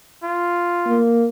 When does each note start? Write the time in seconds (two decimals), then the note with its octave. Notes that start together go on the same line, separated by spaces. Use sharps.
0.23 F4
0.86 A#3